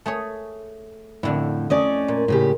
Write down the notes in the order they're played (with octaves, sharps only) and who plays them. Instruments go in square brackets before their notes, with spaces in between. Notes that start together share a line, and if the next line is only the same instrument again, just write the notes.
[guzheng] A3 G#4 C#5
[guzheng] F2 D3 E4 [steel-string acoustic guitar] A2
[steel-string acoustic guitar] A3 C#4 D5 [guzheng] D#5
[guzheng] A#2
[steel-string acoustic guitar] A2 C#3 G4